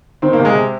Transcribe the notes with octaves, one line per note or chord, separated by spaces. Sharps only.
D#3 C4
A#3
C3
G#3
C3